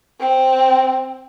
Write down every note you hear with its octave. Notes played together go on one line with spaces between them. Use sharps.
C4